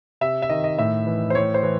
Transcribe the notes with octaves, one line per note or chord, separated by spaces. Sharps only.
C3 E5
E5
D#3 D#5
D#5
A2 E5
E3
C5
A2 C#5
C5
E3